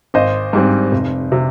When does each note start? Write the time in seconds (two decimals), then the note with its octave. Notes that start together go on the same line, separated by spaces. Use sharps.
0.14 G#1 C5 D#5
0.53 G#2 G3 C4
0.92 F1
1.32 C3